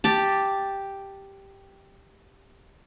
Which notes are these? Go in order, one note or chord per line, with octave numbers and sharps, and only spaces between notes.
G4 A5